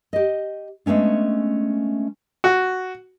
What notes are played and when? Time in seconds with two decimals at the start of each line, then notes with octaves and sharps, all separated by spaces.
0.13 G4 D#5
0.86 G#3 A3 B3 C#4 D4
2.44 F#4